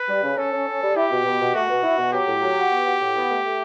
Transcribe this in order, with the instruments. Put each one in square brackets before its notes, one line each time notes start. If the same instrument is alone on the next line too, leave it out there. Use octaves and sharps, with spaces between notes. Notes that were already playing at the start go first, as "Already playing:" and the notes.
Already playing: [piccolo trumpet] B4
[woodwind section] G3
C#3
[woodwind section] C#4 [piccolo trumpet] A4
[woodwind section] C#4
C#4
G3
[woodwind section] E4 [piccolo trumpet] G4
[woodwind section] B2
B2
B2
[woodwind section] A3 [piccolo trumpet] F#4
[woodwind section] B2
E4
B2
[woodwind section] F#3 [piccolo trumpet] G4
[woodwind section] A2
F#3
F#4
B3
F#4
A2
B3
A3
A3